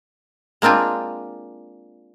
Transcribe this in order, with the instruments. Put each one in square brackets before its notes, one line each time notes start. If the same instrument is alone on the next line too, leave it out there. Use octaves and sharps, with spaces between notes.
[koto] G#3 A#3 C4 D4 F4